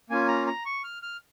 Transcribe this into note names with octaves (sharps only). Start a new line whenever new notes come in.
A#3 C#4 F4 G#5
A#5
A#5
C#6
F6
F6